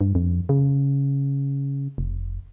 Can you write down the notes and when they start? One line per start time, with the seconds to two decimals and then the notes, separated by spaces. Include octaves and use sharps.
0.01 G2
0.15 F2
0.49 C#3
1.98 F1